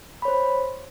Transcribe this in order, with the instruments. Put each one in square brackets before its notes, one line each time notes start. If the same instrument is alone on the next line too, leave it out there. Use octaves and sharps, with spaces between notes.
[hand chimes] B5
C#5
C5